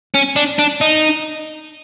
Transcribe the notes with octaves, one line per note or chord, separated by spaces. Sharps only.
C#4
D4
D4
D#4